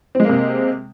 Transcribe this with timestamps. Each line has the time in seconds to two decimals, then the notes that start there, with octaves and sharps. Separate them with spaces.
0.15 C4
0.20 G#3
0.25 A#3
0.29 C3